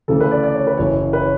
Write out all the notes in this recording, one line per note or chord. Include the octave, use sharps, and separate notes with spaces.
D2 C#3 E3 A3 A4
B4
D5
D5
C#5
B4
F#1 F#2 C#3 E3 C#5
B4
C#5